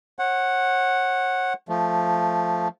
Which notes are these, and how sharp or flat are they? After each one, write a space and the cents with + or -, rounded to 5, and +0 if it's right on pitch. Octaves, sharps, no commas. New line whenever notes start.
C#5 -40 F#5 +0
F3 +0 A3 +0